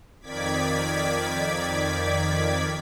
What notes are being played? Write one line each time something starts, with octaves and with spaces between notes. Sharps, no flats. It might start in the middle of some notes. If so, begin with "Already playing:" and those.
F2 D#3 D5 D6 G#6 B6